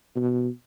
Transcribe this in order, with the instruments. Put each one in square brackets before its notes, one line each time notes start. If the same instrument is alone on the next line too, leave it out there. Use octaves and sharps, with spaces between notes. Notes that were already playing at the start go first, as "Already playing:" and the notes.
[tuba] B2